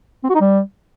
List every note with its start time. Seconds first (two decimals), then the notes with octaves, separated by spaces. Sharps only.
0.24 C4
0.29 F#4
0.35 D#4
0.40 G3